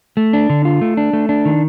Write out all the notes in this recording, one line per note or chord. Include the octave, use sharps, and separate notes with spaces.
A3
D4
D3
F4
A3
D4
A3
D4
D#3